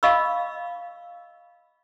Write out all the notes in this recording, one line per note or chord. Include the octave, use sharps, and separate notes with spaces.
D#5 F5 B5 C#6 E6